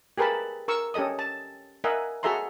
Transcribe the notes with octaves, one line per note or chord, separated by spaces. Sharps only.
G4 G#4 A#4 B4 A5 B5
A#4 C#6 E6
C#4 G4 A4 D#5 D#6
A5
A#4 D#5 E5 F#5 G#5
F#4 G#4 A4 E5 A#5 C6